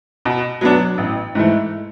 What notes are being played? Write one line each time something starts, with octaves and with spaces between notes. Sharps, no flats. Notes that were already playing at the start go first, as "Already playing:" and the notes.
B2
F#3 B3 D4 F#4
A1
G#2 E3 A3